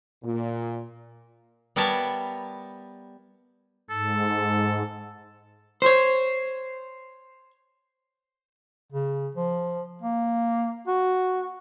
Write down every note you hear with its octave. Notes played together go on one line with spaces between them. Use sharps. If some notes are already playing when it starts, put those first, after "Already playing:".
A#2
G3 B3 A#4 C#5 E5 A5
G#2 A4
C5 C#5
C#3
F3
A#3
F#4